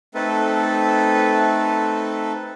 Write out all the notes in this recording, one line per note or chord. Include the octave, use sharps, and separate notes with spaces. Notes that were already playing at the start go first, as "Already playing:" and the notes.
A3 C4 D#4 A4 B4